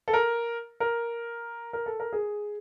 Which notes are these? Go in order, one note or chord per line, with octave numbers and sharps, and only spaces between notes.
A4
A#4
A#4
A#4
A4
A#4
G#4